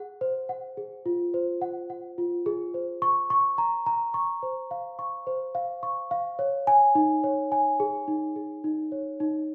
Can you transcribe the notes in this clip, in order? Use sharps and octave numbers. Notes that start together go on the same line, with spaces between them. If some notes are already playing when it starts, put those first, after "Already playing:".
Already playing: G#4 F#5
C5
F#5
G#4
F4
C5
F#5
F#5
F4
G#4
C5
C#6
C#6
A#5
A#5
C#6
C5
F5
C#6
C5
F5
C#6
F5
C#5
G#5
D#4
C#5
G#5
G#4
D#4
G#4
D#4
C#5
D#4